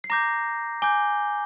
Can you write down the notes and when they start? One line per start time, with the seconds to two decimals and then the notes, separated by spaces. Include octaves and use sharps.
0.04 C7
0.10 A#5 D6 G6 A#6
0.82 G#5 D6 G6 G7